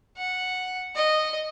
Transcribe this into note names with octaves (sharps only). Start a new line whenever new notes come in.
F#5
D#5